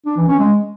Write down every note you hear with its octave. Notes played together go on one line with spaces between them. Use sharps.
D4
E3
C#4
G#3